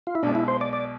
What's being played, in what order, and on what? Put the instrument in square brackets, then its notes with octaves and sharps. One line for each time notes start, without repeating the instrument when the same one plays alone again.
[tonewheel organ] F4
E4
[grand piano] B1 B2 G#3 [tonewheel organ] D4
[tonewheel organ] E4
C5
D5
D5